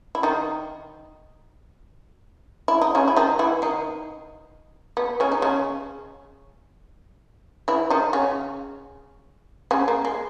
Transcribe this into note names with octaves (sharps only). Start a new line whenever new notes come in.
E4
D#3 D#4
E4
D#4
C#3 C#4
E4
D#3 D#4
E3 E4
D#3 D#4
B3
C#3 C#4
D#4
C#3 C#4
E3 E4
D#3 D#4
C#3 C#4
C#3 C#4
A#3
G#3